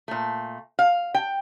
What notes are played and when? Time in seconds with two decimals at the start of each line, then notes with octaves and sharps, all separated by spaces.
0.08 A#2 A3
0.79 F5
1.14 G5